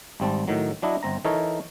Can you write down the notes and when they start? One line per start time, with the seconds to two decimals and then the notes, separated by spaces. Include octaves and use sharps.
0.20 G#1 G3 C4 A5
0.48 A2 D#3 F#3
0.82 F#3 D4 E4 D#5
1.03 G1 C4 A#5
1.25 E3 D#4 A4 A#4 C#5